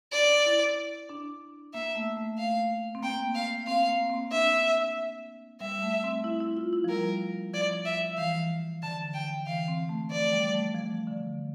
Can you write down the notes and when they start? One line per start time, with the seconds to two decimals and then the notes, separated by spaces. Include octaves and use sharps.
0.12 D5
0.45 E4
1.09 D4
1.73 A#3 E5
1.95 A3
2.17 A3
2.38 F5
2.95 C4
3.03 A#3 G5
3.35 F5
3.67 C4 F5
3.89 A#3
4.10 C4
4.31 D4 E5
5.61 G3 E5
5.82 A3
6.04 C4
6.24 E4
6.40 E4
6.57 F4
6.73 E4
6.84 F3
6.89 G3 A#4
7.53 F3 D5
7.85 E5
8.17 E3 F5
8.83 D3 A5
9.14 G5
9.46 E3 F5
9.68 C4
9.89 A3
10.11 F3 D5
10.32 G3
10.54 A3
10.75 F3
11.07 D3